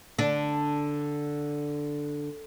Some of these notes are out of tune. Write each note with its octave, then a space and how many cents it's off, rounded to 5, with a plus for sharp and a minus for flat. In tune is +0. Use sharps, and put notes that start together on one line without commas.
D3 +0 D4 +0